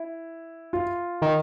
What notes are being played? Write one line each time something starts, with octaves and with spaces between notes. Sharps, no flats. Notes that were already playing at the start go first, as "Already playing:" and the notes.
Already playing: E4
F4
D#3